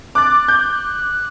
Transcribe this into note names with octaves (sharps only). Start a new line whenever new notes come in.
D6 F#6 A6
G6